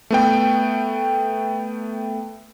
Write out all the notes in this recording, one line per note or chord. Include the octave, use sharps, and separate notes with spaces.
A3 B3 G5